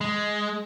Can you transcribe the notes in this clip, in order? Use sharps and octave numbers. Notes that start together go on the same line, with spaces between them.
G#3